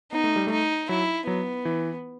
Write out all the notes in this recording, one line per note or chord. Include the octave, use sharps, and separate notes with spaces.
B3 D#4
A3
G3
A3 D#4
F#3 E4
F#3 B3
E3